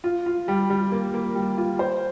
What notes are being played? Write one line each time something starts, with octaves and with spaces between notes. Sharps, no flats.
F4
F4
G3
G3
A#3
A#3
G3
F4
C5